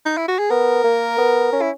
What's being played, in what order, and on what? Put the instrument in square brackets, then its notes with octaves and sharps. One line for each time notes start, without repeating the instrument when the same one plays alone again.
[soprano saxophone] D#4
E4
F#4
G#4
[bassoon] B3 [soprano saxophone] A#4
[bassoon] A#3
B3
C#4
[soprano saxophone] E4